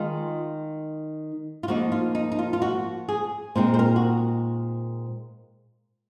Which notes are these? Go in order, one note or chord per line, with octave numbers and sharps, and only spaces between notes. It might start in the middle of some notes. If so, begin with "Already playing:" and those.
Already playing: D#3 G#3 D#4 F4
F4
F3 A#3 D#4 F#4
F4
D#4
D#4
F4
F4
F#4
G#4
A#2 G#3 C4 D#4 C5
C5
A#4
F#4